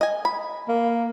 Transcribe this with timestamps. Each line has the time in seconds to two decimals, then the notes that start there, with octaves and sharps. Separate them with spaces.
0.01 D#5 G#5
0.25 B5
0.68 A#3